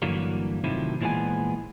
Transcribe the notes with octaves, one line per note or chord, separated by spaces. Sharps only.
G2 D3 E3 F#3 G3 A#3
A2 C3 D#3 F3 F#3 E4
A#2 E3 F3 G#3 B3 G#5